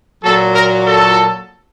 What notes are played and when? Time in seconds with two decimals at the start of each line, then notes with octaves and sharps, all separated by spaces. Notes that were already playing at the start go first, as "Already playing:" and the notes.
0.24 A#2 F#3 A4
0.55 A#4
0.87 A4